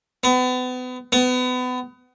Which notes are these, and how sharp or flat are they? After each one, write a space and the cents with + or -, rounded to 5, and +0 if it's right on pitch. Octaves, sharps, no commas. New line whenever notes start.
B3 +35
B3 +30